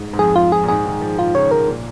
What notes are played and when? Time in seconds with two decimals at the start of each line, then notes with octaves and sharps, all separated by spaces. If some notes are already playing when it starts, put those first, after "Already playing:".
Already playing: G#2
0.13 G#2
0.19 F2 G#4
0.36 F4
0.52 G#4
0.64 A#2
0.68 G#2 G#4
0.86 D#3
1.01 F3
1.18 D#3 F4
1.35 C#3 C#5
1.51 C#3 A#4
1.68 A#2